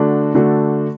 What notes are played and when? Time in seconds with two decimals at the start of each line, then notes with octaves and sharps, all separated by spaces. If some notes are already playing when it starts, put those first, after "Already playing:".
Already playing: D3 A3 D4 F#4 A4
0.35 D3 A3 D4 F#4 A4